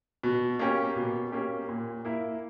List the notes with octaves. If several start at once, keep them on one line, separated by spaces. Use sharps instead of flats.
B2
A#3 C#4 G4
B2
A#3 C#4 G4
A#2
A#3 E4